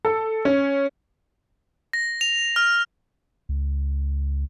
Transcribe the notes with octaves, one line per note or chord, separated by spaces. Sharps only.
A4
C#4
A#6
F7
F6
C#2